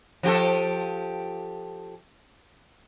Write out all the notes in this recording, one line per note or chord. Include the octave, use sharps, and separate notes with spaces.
F3 G4 A4